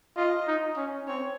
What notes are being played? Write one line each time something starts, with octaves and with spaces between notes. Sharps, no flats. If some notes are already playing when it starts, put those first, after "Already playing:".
F4 D#5
D#4
C#4
C4 C#5